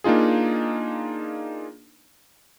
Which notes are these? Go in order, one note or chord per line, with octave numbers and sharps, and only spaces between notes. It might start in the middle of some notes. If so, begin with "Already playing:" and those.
A#3 D4 D#4 F4 G#4